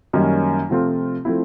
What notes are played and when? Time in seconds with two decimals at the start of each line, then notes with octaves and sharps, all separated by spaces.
0.13 F#2 D#3 G3 A#3 C#4
0.70 C3 F3 A3 C4 F4
1.25 F3 A3 C4 E4